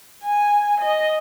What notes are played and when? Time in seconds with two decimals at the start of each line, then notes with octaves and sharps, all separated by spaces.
0.23 G#5
0.80 D#5